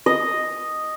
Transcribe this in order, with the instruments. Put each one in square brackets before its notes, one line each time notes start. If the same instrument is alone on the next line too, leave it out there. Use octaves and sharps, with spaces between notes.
[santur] D#5